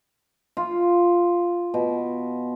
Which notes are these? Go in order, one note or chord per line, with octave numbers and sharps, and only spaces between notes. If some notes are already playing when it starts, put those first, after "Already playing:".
F4
B2